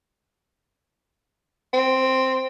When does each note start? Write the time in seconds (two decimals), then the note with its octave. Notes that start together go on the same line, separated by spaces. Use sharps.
1.73 C4